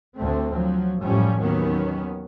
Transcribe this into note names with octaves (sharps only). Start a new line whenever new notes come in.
D2 D3 A3 C4
F3 F#3
A1 F#2 A2 F3 G3 C#4
D#2 D#3 F#3 B3 C#4